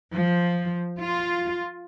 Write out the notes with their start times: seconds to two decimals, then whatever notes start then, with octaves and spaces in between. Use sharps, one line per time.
0.12 F3
1.00 F4